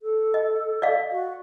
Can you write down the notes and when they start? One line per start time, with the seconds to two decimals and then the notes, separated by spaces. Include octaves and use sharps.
0.02 A4
0.34 D#5
0.82 D5 D#5 F5
1.12 F#4